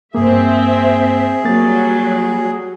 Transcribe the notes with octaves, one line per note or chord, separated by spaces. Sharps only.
G2 A#3 C4 G#4 E5
F#3 G3 A#3 A6